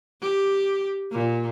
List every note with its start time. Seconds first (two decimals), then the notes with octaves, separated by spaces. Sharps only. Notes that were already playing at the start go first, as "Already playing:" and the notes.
0.22 G4
1.12 A#2